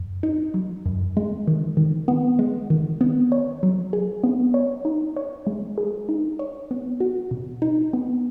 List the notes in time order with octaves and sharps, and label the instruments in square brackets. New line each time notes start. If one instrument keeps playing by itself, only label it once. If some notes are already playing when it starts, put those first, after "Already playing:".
Already playing: [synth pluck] F#2
D#4
F#3
F#2
G#3
D#3
D#3
B3
G#3
D#3
B3
C#5
F#3
G#4
B3
C#5
D#4
C#5
G#3
G#4
D#4
C#5
B3
F#4
B2
D#4
B3